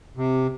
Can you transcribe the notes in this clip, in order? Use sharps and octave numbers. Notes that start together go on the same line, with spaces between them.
C3